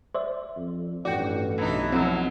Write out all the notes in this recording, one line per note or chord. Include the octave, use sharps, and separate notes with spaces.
C5 D5 E5
F2
A1 G2 F#4 D5 G5
B1 E3 D4 D#4
F2 G#2 B2 F#3 C4 E6